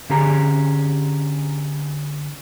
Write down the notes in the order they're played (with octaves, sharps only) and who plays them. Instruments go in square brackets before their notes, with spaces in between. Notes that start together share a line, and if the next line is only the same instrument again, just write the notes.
[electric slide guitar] D3 C#4 G4 G#4 A#5